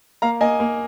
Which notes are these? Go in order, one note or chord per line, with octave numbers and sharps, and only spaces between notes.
A#3 F5 A#5
A#3 D#5 G#5
A#3